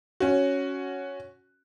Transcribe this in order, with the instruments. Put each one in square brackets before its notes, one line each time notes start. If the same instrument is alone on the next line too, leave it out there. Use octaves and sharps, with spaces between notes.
[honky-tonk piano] C#4 F#4